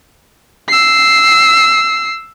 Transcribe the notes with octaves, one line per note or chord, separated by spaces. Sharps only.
E6 C7